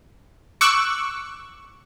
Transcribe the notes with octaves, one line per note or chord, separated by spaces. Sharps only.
C#6 D6 E6 F#6